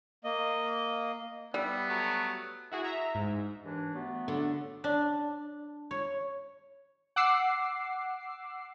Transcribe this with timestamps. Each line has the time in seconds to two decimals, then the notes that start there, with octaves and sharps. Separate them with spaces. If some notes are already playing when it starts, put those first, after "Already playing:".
0.24 A#3 D#5
1.54 G3 B3 E5
1.89 F#3 A3
2.71 E4 F#4 G#4
2.84 E5 A#5
3.15 G#2
3.64 D#2 E3 D4
3.94 F#3 A3 B3
4.28 D3
4.84 D4
5.91 C#5
7.16 F#5 D6 E6 C7